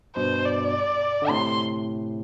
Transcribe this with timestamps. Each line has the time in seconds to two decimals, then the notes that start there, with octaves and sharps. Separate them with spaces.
0.16 G2 B2 C5
0.45 D5
1.22 D3
1.29 A2 C3 C6